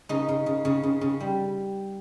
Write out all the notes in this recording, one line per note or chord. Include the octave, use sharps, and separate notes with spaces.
C#3 D#4
C#3
C#3
C#3
C#3
C#3
G3